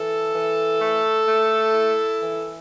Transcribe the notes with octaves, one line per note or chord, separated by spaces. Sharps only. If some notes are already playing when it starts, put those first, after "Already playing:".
Already playing: E3 A4
E3
A3
A3
E4
E3